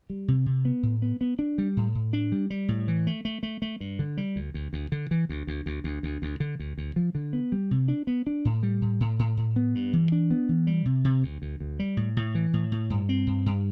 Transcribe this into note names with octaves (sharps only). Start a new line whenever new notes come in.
G3
C3
C3
B3
A2
B3
B3
D4
G3
A2
A2
D4
G3
G3
A2
E3
A3
A3
A3
A3
G2
D3
G3
D2
D2
D2
D3
E3
D2
D2
D2
D2
D2
D2
D3
D2
D2
F3
D3
B3
G3
C3
D4
B3
D4
A2
G3
A2
A2
A2
A2
B3
G2
E3
D4
B3
E3
G3
C3
C3
D2
D2
D2
G3
A2
A2
E3
A2
A2
G2
C4
G2
G2